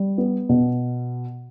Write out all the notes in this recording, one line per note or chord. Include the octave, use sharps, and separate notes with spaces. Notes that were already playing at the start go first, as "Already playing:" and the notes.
Already playing: G3
B3
B2